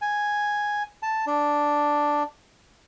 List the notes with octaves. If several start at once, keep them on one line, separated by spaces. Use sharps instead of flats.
G#5
A5
D4